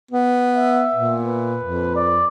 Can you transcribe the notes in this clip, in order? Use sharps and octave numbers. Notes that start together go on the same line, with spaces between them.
B3
E5
A#2
B4
F2
D5